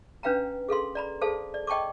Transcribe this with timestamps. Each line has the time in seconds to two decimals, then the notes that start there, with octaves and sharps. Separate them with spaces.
0.23 C#4 D4 B4 F5 G5 A#5
0.69 G#4 A4 F5 C6
0.95 D5 A#5 B5
1.21 G#4 A4 C5 F5 A5
1.54 D5
1.67 D#5 G5 A5 C#6 D6